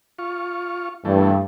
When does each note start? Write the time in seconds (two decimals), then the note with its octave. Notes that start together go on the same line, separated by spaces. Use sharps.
0.19 F4 C#6
1.05 G2 E3 A3